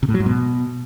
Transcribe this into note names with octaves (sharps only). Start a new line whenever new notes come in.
C3
A2
F#3
G#2
B2